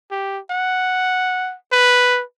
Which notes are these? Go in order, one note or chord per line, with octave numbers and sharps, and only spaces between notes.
G4
F#5
B4